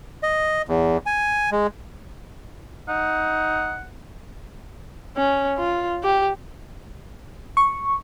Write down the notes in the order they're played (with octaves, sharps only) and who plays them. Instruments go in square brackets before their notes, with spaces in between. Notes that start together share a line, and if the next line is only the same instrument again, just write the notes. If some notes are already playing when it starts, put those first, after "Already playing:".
[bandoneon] D#5
E2
G#5
G#3
[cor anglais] D#4 [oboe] F#5
[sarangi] C#4
F4
G4
[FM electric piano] C#6